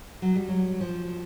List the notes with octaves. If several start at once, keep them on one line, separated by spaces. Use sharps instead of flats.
F#3
G3
F#3
F3